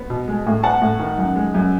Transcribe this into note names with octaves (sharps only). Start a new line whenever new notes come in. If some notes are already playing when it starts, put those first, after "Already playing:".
Already playing: B3
B2
G#3
A2
B3 F#5 A5
A2
D#3
F#2
G#3
F#2